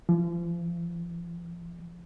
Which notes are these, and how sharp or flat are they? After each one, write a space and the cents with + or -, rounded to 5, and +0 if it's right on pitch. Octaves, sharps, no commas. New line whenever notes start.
F3 -35